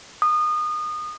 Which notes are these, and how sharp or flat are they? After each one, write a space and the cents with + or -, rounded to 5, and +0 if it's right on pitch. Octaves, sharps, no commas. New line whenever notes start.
D#6 -25